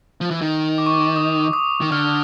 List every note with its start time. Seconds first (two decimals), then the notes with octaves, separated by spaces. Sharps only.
0.21 F3
0.31 E3
0.41 D#3
0.78 D6
0.86 C#6
0.94 D6
1.16 D#6
1.53 D#6
1.81 D#3
1.91 D3 F6